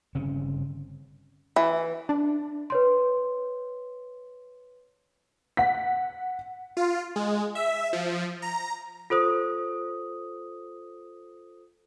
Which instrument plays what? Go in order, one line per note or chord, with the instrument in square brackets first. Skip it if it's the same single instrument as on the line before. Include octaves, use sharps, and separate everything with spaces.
[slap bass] G1 C#3 C4 C#4
[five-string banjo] E3
[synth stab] D4
[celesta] B4 C#5 C6
[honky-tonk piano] F#5 B6
[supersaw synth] F4
G#3
E5
F3
A#5
[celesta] F4 A4 C5 D#6